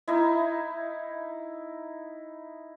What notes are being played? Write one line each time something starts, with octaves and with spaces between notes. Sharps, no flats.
D#4 E4